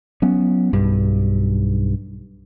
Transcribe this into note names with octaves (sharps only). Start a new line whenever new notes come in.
F#3 B3 C#4
B1 G2